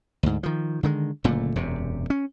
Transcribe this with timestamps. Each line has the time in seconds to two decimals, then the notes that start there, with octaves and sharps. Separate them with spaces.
0.23 D2 G#2
0.43 D#3 F3
0.83 D3 D#3 G#3
1.24 F#1 A#2 D3 A3
1.56 E1 F#2 C3
2.10 C#4